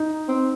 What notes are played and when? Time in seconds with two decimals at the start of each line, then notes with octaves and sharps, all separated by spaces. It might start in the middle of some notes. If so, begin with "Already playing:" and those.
Already playing: D#4
0.29 C4